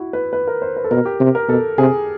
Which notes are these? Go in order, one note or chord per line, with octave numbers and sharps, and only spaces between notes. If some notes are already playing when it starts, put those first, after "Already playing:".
Already playing: E4 F#4
B4
B4
A#4
C5
B4
A4
B2 A#4
G4
C3
A#4
B2 A4
C3 G#4